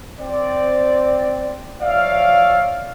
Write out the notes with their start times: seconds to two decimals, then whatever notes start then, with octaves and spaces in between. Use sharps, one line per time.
0.20 C4 D5
1.82 F3 C#5 D5 E5 F5